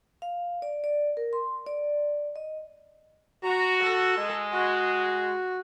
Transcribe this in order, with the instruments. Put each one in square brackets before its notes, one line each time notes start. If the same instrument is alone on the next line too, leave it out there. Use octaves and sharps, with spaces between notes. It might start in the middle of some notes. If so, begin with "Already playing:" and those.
[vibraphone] F5
D5
D5
A#4
C6
D5
D#5
[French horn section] F#4 [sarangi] A#5
[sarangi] A4
[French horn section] G#3
[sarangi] F#4